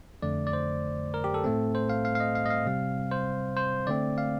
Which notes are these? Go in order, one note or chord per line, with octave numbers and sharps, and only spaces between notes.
F2 D3 A3 D5
D5
C5
A#4
G4
A4
A2 A3 C4
C5
F5
F5
F5
D#5
F5
D#5
F5
C3 G3 C4
C5
C5
D3 A3 C4 D5
F5